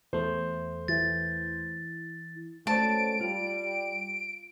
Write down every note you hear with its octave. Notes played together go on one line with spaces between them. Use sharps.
E2 A3 C5
E3 A6
A3 C#4 F#4 A4 C5 D5 A5 D7
G3 F4